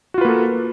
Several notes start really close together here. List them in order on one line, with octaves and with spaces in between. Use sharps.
F#4 F4 B4 A#3 A4